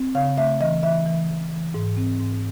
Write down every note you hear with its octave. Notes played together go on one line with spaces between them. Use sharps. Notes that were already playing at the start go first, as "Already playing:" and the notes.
Already playing: C4
C#3 F5
A3 E5
E3 D#5
E3 E5
E3
E3
E3
G#2
C4
G#2